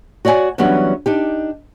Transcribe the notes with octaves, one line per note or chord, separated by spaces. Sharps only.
F#4 C#5 D5 E5 G#5
E3 F#3 G3 B3 C#4 D4
D4 D#4 G4